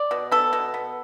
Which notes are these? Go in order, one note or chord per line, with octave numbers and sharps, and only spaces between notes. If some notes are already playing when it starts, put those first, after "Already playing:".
Already playing: D5
B2
B3 A4
B2
B3